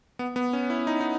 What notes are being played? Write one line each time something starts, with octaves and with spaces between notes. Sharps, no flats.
B3
B3
C#4
E4
D#4
D#4